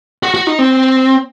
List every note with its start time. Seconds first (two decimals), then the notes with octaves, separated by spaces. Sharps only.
0.23 F#4
0.34 F#4
0.47 D#4
0.59 C4